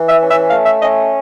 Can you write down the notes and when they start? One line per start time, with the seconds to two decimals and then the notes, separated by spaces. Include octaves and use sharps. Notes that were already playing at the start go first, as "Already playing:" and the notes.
Already playing: E3
0.09 E5
0.20 C#4
0.30 E5
0.50 A3 F5
0.66 E5
0.82 C#4 D#5